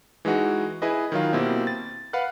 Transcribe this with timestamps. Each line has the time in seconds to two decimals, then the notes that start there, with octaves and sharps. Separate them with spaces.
0.25 E3 G#3 D#4 F#4 G#4
0.82 E4 G#4 B4 D#5
1.12 D#3 F#3 F4
1.33 B2 A#3 C4 E4 G4
1.67 A6
2.13 B4 F5 F#5 F#6